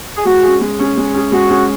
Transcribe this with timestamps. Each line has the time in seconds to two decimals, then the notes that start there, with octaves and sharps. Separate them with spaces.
0.17 G#4
0.25 G#3 F#4
0.43 C#4 G#4
0.61 G#3
0.79 C#4 G#4
0.97 G#3
1.14 C#4 G#4
1.32 G#3 F#4
1.50 C#4 G#4